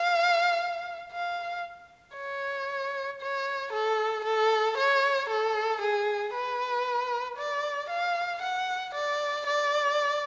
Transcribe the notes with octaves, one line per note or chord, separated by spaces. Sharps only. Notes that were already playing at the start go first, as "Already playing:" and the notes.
Already playing: F5
F5
C#5
C#5
A4
A4
C#5
A4
G#4
B4
D5
F5
F#5
D5
D5